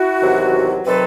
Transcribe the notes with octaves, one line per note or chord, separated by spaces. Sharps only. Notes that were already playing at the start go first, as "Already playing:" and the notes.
Already playing: E4 F#4
E2 C3 D#3 F#3
C3 D#3 F#3 A4 B4